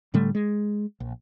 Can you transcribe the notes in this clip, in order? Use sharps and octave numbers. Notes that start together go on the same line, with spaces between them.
A2 D3 G3 A3
G#3
A#1